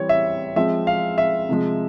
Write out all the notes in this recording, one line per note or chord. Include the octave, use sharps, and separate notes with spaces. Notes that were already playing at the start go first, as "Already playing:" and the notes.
Already playing: E3 G3 C4 C#5
E5
F3 G#3 C4 E5
F5
E5
C3 F3 G#3